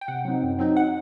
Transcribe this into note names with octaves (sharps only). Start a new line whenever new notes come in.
G5
C3 F#5
F#3 C4 D#4
F#2
F#3 C4 D#4
F#5